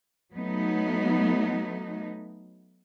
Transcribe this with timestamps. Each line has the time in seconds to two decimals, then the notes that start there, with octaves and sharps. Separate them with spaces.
0.33 F#3 A3 B3 D#4